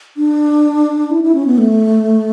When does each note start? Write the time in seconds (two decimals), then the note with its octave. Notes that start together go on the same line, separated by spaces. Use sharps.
0.17 D4
1.11 E4
1.23 E4
1.35 C#4
1.46 B3
1.58 A3